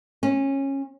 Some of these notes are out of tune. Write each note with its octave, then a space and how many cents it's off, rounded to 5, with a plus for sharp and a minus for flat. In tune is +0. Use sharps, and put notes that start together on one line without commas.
C#4 -20